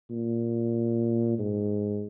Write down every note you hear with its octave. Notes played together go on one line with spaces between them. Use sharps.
A#2
G#2